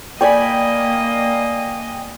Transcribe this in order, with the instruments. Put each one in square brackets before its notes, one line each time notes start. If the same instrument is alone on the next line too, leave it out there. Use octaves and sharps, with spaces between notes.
[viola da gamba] A#3 D#5 [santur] D5 G#5 B5 [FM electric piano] G5